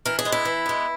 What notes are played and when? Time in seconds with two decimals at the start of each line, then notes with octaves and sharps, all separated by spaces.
0.06 E3 A#4
0.19 G#4
0.25 G#3 B3
0.32 E4
0.45 E3
0.66 G#3 B3